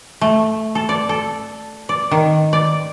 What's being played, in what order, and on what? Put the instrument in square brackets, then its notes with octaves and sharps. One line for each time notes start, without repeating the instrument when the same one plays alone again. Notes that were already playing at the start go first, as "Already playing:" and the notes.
[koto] A3
A4
D5
A4
D5
D#3
D5